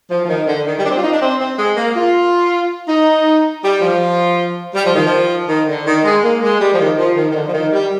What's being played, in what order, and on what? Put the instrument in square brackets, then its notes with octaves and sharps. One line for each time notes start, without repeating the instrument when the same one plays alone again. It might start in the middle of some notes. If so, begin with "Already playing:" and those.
[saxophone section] F3
F3
D#3
D3
D#3
G3
D4
C4
F4
D#4
D4
C4
C4
G#3
A#3
F4
D#4
G3
F3
G3
F3
D#3
F3
D#3
D3
D#3
G#3
A#3
G#3
G3
F3
D#3
F3
D#3
D#3
D3
F3
D#3
G3